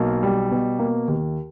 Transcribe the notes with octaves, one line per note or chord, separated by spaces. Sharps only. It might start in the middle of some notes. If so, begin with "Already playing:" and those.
Already playing: B1 A#3
G3
B2
A#3
D#2